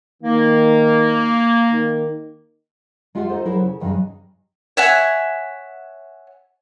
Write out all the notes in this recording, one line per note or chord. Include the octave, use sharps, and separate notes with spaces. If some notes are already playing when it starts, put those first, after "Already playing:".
D#3 A#3
D#3
G#3 F4 G4 E5 F#5
D#4 F4 A4 C5
F#3 E4 G#4 A#4 C5 C#5
C#3
E2 G2 C#3 F#3 D#4 G#4
C#5 E5 F#5 G#5